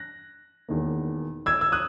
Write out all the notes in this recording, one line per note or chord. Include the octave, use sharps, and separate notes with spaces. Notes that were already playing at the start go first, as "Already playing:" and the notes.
Already playing: F#6 A#6
E1 E2 D#3 A#3
E6 G#6
E6
D#6 F#6